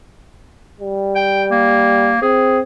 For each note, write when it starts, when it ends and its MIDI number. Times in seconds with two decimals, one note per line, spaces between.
0.80 2.15 55
1.16 1.44 79
1.51 2.20 58
2.22 2.61 60
2.22 2.59 68